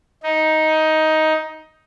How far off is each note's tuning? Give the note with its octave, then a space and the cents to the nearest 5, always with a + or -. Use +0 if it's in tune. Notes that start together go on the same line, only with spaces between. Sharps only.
D#4 +10